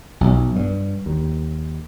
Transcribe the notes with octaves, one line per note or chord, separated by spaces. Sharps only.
B1
G2
D#2